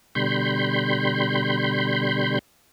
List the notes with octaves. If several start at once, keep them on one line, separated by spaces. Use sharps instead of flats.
B2 D3 G3 B5 C6 G6